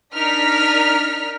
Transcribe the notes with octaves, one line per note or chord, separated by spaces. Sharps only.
D4 D#4 A#4 F6 B6